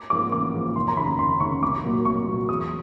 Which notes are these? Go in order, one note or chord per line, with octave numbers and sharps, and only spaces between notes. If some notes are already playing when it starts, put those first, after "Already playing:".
Already playing: D6
G#2 F3 A#3 D6
A1 D6
G#2 F3 A#3
F1 C6
A#5
D#2 C#3 B5
F1 C6
D#2 C#3 C#6
C2 D6
A#2 F#3 A#3
C2 C#6
A#2 F#3 A#3
E2 D#6